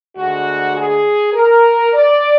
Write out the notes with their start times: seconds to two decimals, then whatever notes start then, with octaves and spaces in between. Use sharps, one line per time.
0.16 D2 D3 G#3 F#4
0.75 G#4
1.33 A#4
1.92 D5